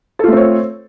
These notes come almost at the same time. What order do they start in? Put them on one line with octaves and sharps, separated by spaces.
A4 F4 A3 C4 C#5